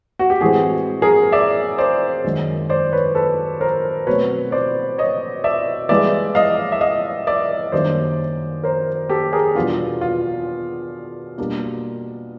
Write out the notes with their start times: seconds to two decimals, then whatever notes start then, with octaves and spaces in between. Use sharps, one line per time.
0.19 F#4
0.30 G4
0.41 A2 E3 G#3 C4 F#4 G#4
1.02 G#4 A#4
1.32 D5 E5
1.78 C5 D5
2.24 F#2 D#3 G#3
2.70 C5 D5
2.93 B4 C#5
3.15 A4 B4
3.61 A#4 C5
4.07 B2 F#3 A3 C4 B4 C#5
4.52 C5 D5
4.98 C#5 D#5
5.44 D5 E5
5.89 G2 E3 G#3 B3 D5 E5
6.35 D#5 F5
6.72 E5
6.81 D#5 F5
7.27 D5 E5
7.72 F#2 D#3 G3 A#3 D4 C5 D5
8.64 A#4 C5
9.10 G4 A4
9.33 G#4 A#4
9.55 E2 B2 G3 B3 D4 F4
10.01 F4
11.38 B2 G3 A#3 D4